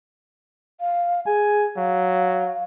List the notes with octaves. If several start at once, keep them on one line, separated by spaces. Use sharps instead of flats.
F5
G#4 G#5
F#3 F5